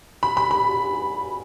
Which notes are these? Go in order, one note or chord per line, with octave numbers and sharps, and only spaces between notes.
B5
B5
B5